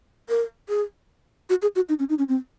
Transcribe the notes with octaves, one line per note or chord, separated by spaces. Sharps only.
A#4
G#4
F#4
G#4
F#4
D#4
C#4
D#4
C#4
C4